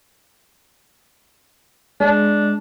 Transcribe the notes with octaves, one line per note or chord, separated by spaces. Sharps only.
G#3 D4